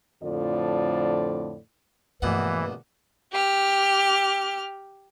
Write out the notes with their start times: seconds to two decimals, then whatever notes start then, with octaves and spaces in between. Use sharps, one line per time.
0.22 F2 A2 D3 F3 D5
2.22 A#1 G2 B2 E3 A3 F#5
3.31 G4 F6